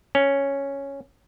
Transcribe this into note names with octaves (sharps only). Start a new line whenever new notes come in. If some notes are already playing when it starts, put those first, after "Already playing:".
C#4